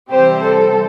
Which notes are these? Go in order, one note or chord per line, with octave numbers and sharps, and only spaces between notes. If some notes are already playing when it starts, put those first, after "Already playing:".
C3 E3 G3 C4 G4 C5
A4